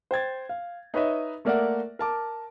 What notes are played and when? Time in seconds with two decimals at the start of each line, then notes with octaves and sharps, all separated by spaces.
0.11 C5 G5 G#6 A6
0.49 F5
0.94 D#4 B4 C#5 D#5 E5
1.45 A3 A#3 A#4 D5 E5 F#5
1.99 A#4 A5 D6